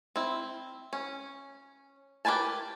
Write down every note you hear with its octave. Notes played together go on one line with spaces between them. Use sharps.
C4 E4
C#4
G4 A#4 B4 G#5 A5